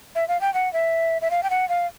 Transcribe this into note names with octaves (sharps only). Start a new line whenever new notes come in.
E5
F5
G5
F#5
E5
E5
F5
G5
F#5
F5